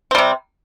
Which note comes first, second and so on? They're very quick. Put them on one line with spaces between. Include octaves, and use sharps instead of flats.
C4 G3 C3